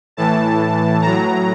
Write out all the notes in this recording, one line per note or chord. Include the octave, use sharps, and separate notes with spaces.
A2 E3 A5
A2 F#3 A#5